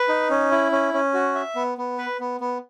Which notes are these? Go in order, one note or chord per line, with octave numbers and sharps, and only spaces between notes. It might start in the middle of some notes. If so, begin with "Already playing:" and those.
Already playing: B4
D#4
C#4
E4
C#4
C#4
F#4
E5
B3
B3
B4
B3
B3